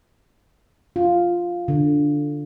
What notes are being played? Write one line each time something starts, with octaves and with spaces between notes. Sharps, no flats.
F4
D3